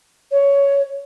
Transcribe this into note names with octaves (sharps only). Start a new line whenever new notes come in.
C#5